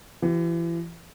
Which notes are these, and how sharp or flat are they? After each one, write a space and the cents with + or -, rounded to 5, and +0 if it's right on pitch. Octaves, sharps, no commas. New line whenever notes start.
E3 +35 G4 -40